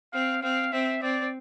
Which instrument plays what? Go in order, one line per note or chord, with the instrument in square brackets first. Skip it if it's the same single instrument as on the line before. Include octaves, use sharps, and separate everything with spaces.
[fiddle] C4 [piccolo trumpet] F5
[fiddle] C4 [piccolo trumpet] F5
[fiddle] C4 [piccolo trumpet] E5
[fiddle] C4 [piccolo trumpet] D5